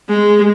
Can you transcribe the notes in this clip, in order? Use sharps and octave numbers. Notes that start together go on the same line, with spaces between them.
G#3